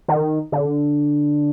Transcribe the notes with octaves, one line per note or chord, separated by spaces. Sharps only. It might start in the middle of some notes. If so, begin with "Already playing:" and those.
D#3
D3